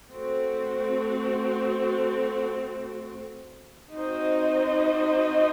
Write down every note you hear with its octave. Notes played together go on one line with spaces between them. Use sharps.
A3 C4 F#4
C4 D#4 F#4 C5 D#5